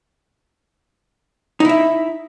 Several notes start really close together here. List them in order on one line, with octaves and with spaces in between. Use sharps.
D#4 E4 E5